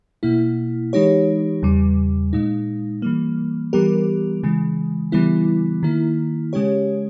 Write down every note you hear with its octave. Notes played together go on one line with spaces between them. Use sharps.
B2 A#3 E4
E3 G#3 D#4 G4 C#5
E2 C#3 G3
A#2 G#3 D#4
E3 G3 A#3
E3 G3 B3 G4 A#4
C#3 E3 G#3
C#3 E3 G3 B3 E4
D#3 A#3 E4
C#3 G#3 C#4 G4 C#5